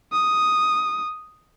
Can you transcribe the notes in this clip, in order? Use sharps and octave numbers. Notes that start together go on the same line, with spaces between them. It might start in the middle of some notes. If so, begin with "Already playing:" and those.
D#6